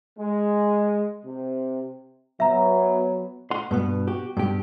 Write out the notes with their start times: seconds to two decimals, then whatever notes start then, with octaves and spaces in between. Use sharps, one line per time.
0.19 G#3
1.25 C3
2.40 F#3 B3 E5 A#5
3.51 F#5 C6
3.71 G2 B2 B3
4.07 F#4 G4
4.37 G2 B2 G4